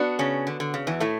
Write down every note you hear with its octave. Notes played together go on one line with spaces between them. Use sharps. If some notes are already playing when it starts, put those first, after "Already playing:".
Already playing: B3 D4 F#4
C#3 C#4
D3
D3
C#3
E2 E3
A2 A3